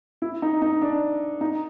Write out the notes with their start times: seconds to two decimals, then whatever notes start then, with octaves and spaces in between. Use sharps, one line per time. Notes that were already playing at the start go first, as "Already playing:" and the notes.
0.22 E4
0.42 D#4
0.62 D#4
0.82 D4
1.41 D#4